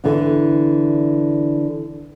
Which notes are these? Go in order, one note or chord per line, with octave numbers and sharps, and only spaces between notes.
D3 E3 B3 D4